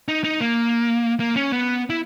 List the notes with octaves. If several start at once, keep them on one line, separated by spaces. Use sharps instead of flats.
D#4
D#4
A#3
A#3
C#4
B3
E4